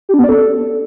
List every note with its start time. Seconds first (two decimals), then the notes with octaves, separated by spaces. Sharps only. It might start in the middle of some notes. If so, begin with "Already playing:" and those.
0.09 G4
0.14 D4
0.19 B3
0.24 D5
0.29 A4